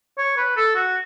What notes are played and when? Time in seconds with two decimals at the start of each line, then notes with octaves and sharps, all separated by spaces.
0.18 C#5
0.37 B4
0.57 A4
0.75 F#4